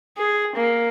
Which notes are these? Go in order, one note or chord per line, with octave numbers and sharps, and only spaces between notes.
G#4
A#3